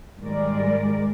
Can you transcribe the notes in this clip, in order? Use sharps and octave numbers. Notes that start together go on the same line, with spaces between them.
G#2 D#3 G3 G#3 A#4 D5